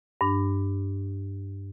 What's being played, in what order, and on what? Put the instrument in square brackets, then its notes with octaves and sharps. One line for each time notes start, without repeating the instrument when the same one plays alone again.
[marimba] G2 D4